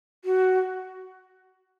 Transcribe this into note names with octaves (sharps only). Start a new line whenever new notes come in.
F#4